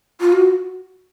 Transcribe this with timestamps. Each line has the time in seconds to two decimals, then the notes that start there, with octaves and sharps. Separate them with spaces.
0.20 F4
0.33 F#4